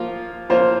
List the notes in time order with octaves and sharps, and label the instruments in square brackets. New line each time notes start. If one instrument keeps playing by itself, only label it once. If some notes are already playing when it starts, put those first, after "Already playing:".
Already playing: [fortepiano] F3 A#3 F4
[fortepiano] F3 A#3 F4 [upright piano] C5